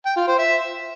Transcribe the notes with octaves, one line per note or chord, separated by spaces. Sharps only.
G5
F4
C5
E5